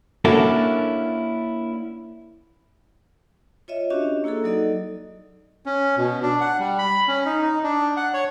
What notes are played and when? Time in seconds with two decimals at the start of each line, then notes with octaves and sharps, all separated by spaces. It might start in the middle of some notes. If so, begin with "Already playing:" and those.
0.25 A#3 C#4 D4 E4 F#4 A4
3.68 F4 C#5 D#5 E5
3.90 C#4 D4 F#4 G4 D#5
4.24 A#3 E4 F#4 G#4 A4
4.44 F#3 D#4 A4 D5 D#5
5.66 C#4
5.98 B2
6.23 D4
6.41 F#5
6.59 G3
6.79 B5
7.08 C#4
7.26 D#4
7.43 D#4
7.64 D4
7.97 F#5
8.14 C#5